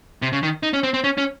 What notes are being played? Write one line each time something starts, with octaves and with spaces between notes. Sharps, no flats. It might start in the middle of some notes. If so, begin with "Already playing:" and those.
C3
C#3
D#3
D#4
C#4
C4
C4
C#4
C#4